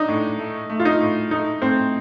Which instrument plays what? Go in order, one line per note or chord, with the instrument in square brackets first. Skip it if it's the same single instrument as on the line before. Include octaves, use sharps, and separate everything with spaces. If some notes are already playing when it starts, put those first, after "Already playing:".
Already playing: [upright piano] D4 [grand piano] D#4
[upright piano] A2
A3
A3
[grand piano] F4
D#4
[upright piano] A2
[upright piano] A3 [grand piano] D#4
[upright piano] A2 [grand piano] C4